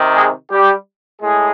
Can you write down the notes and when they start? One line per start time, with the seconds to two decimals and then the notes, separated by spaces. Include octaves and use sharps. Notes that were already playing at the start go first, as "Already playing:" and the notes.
Already playing: C3 D#3
0.15 G#3 G#4
0.51 G3 G4
1.22 A2 G#3 G#4